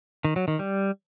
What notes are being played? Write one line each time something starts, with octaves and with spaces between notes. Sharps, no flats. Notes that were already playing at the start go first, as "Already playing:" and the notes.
D#3
F#3
D#3
G3